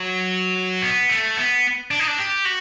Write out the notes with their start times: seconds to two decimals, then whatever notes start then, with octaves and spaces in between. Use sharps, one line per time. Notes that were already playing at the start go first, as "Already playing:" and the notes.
Already playing: F#3
0.82 B3
1.09 A3
1.37 B3
1.91 D4
1.99 D#4
2.07 D4
2.19 G4
2.45 F#4